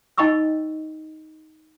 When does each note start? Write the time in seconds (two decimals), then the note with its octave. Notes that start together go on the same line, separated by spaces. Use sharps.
0.18 D#4 D#5 G5 B5 C#6 E6